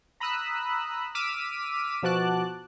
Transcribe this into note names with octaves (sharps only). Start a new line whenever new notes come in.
A#5 B5 D#6 E6 F#6
D6 E6 F6 B6 D#7
B2 F3 F#4 A5 D6 F#6